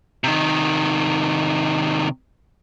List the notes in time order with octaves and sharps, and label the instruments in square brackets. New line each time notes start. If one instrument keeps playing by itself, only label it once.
[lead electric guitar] C3 D#3